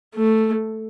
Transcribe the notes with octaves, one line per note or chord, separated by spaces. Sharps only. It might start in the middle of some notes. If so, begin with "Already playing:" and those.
A3